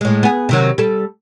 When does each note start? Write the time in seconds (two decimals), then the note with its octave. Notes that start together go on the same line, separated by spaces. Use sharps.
0.01 A2 G#3
0.23 B3 G#4
0.49 C3 D#3 F#3
0.78 G3 A4